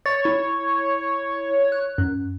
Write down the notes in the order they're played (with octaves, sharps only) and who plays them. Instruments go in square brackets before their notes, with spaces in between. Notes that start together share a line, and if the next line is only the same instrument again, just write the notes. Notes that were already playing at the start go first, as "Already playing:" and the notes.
[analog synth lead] C#5 [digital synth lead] A6
[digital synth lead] E4
F#6
F#2